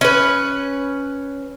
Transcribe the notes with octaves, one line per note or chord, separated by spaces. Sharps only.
C#4 B4